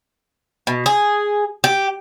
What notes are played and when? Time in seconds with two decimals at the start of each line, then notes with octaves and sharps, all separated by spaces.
0.67 B2
0.86 G#4
1.64 G4